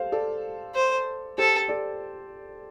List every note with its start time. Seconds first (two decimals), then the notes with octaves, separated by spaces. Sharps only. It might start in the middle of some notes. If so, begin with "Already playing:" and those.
Already playing: G4 A4 C5 F5
0.12 A4 D5
0.75 C5
1.38 G4 A4 C5
1.68 A4 D5